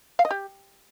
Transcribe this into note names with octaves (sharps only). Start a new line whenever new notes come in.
F5
D#5
G4